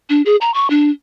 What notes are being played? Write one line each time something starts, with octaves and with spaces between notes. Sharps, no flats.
D4
G#4
A#5
C#6
D4